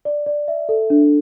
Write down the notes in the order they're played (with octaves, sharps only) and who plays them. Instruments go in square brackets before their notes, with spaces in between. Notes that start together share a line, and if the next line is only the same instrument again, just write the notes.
[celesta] D5
D5
E5
A4
D4